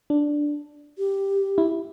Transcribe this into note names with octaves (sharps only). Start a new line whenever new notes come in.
D4
G4
E4